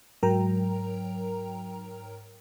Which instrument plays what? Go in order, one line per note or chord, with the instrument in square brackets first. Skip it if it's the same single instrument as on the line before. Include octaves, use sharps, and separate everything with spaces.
[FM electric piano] G#2 F#3 A#4 G5 A#5